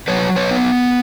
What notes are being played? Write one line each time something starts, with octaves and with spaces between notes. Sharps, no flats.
F#3 B4 C#5
B4 C#5
B3